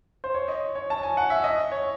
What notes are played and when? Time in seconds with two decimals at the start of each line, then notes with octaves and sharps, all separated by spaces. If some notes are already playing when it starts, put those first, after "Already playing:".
0.24 C5
0.34 C#5
0.48 D#5
0.75 C#5
0.90 A5
1.03 G#5
1.17 F#5
1.30 E5
1.44 D#5
1.72 C#5